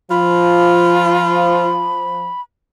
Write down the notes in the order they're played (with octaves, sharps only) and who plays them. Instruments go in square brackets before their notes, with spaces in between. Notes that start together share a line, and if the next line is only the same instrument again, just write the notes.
[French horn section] F3 [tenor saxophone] F4 [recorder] B5